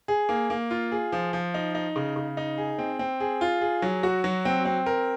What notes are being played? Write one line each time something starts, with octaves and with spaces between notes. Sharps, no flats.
G#4
A#3
A#3
F4
G#4
F3
F3
D#4
D#4
C#3
C#3
D#4
G#4
C4
C4
G#4
F4
G#4
F#3
F#4
F#3
C4
C4
A#4